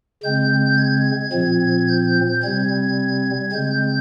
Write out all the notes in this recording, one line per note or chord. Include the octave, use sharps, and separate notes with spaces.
C#3 G#3 C4 G6
G#6
A#2 F3 C4
G6
C3 G3 C4 G#6
C#3 G#3 C4 G6